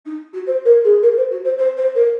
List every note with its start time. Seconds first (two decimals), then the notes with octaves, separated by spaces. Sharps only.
0.05 D#4
0.33 F#4
0.46 C5
0.65 A#4
0.84 G#4
1.02 A#4
1.16 C5
1.30 F#4
1.44 C5
1.57 C5
1.76 C5
1.95 A#4